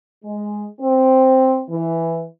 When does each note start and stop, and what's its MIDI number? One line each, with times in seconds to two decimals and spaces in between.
0.25 0.65 56
0.81 1.63 60
1.70 2.25 52